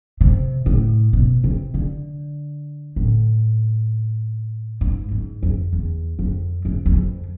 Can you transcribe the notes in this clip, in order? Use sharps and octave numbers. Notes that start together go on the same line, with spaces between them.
C3
A2
B2
C3
D3
A2
G#2
G#2
F2
E2
F2
F2
E2
F2